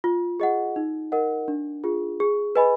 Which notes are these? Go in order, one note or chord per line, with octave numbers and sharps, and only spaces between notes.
F4
G#4 D#5 F#5
D#4
A#4 D#5 F#5
D4
F4 G#4
G#4
B4 D#5 G#5 B5